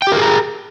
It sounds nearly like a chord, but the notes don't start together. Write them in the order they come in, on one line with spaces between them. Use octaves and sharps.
G5 G4 A#4 G#4 A#5